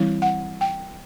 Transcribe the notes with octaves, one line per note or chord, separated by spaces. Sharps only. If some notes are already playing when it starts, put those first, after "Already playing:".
Already playing: E3 G3 C4 E4
F#5
G5